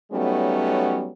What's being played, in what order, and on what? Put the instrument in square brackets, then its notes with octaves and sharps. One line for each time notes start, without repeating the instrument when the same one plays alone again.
[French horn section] F#3 G3 A3 B3 C#4 D#4